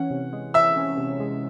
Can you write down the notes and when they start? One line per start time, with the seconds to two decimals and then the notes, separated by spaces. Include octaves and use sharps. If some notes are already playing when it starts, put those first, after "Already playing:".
Already playing: E3 C#4 F#5
0.11 C3
0.33 G#3
0.54 E3 E5 E6
0.77 C#4
0.98 C3
1.20 G#3